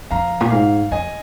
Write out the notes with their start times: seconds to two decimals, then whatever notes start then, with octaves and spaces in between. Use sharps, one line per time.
0.10 F2 F5 A#5
0.40 A#2
0.51 G#2 F5
0.91 F2 D#5 G#5